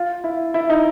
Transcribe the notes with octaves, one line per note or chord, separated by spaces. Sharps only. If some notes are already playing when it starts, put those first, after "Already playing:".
Already playing: F4
E4
E4
D#4